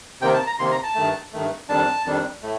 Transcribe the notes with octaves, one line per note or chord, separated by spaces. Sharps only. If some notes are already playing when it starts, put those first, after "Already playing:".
C3 D#3 A#3 G5
A5
A#5
C3 D#3 A#3 C6
A#5
A5
G2 D#3 A3
G2 D#3 A3
F2 D#3 G3 D4 A5
F2 D#3 G3 D4
A2 A3